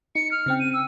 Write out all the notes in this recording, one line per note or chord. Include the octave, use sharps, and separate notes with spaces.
D#4 C#7
F6
C#3 C4 G5
D#7
E6